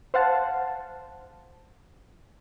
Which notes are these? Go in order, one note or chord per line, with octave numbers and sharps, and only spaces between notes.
C5 F5 F#5 A5